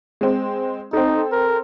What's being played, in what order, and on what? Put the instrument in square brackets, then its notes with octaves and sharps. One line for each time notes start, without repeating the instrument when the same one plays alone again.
[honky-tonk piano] G#3 C4
[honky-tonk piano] C4 A4 [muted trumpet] D#4
[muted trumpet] A#4